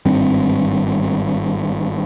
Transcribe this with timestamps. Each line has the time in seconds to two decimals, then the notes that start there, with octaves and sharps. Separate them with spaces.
0.05 G#1 G2 C4